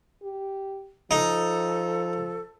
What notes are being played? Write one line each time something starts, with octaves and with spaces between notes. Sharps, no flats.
G4
F3 D#4 A4